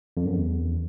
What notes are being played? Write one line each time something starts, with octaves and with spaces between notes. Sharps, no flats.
F2
F#2
E2